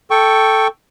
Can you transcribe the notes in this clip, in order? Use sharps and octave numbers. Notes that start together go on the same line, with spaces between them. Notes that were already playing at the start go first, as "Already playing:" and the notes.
A4 G5 C#6